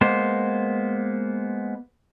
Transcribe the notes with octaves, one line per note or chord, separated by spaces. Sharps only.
G#3 A#3 B3 C5